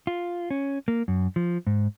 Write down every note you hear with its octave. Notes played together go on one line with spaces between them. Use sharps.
F4
C#4
A#3
F#2
F3
G#2